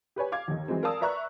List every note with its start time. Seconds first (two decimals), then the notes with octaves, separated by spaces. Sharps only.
0.16 G4 B4 C#5 G#5
0.32 F5 D6 G#6
0.48 D#2 D#3
0.68 E3 F#3 G#3 C4
0.83 A#4 D5 F5 A5 D#6 E6
1.01 B4 D5 E5 A#5 C#6 F#6